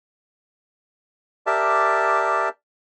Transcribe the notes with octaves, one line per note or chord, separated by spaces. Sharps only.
G4 A#4 D5 E5 A5